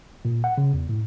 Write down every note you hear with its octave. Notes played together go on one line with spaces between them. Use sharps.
A#2
F#5
C#3
E2
A2